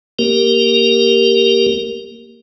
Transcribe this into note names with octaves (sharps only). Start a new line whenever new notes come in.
A#3 G4 A#4